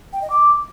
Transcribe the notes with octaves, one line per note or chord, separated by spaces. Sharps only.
G5
D#5
D6